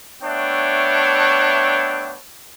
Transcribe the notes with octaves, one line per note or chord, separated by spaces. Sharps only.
A3 B3 D4 C#5 E5 G5